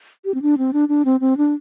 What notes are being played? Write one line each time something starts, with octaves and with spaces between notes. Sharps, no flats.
G4
C4
D4
C4
D4
D4
C4
C4
D4